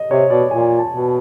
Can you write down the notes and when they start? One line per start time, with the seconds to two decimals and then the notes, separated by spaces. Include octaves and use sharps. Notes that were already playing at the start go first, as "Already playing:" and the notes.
Already playing: D#5
0.10 C3 C#5
0.30 B2 D5
0.51 A#2 G#5
0.79 A5
0.92 B2